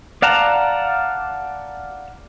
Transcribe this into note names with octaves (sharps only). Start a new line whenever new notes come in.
D5 F5 F#5 A5 A#5